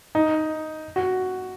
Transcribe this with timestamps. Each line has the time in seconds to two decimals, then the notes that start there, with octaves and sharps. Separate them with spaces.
0.15 D#4
0.96 F#4